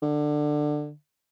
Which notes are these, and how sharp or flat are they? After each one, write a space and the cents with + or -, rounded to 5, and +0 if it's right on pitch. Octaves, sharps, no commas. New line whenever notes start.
D3 +15